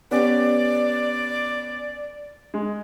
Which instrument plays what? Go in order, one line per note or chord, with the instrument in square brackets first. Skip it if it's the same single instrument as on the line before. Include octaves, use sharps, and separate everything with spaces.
[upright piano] B3 C#4 G4 [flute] D5
[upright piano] G#3